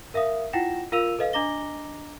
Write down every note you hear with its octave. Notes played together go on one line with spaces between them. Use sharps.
A#4 E5 F5 D#6
E4 F4 F#5 G5 A#6 E7
F4 A#4 F5 E6 D#7 F7
A4 B4 D#5 F5
D4 D#5 A#5 D6 A#6 G7